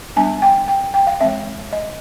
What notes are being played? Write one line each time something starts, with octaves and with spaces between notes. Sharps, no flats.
G3 B3 D4 G#5
G5
G5
G5
F5
E3 G#3 C4 E5
D#5